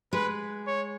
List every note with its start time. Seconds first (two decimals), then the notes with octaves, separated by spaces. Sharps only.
0.13 G#3 B4
0.67 C#5